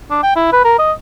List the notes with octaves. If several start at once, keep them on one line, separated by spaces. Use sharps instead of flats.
D4
G5
E4
B4
A#4
D#5